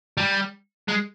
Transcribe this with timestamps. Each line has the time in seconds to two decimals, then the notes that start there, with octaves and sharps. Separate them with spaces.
0.17 G3
0.88 G#3